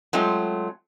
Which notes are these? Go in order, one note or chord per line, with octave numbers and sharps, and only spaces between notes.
F#3 G#3 A3 C4 F4